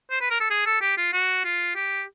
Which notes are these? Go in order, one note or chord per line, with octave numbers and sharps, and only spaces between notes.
C5
B4
A#4
A4
G#4
A4
G4
F4
F#4
F4
G4